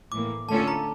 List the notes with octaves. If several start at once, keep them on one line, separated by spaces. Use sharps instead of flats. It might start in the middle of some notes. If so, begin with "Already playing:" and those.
A2 E3 A#3 D6
D3 A3 C#4 F4 A4 A5
A#5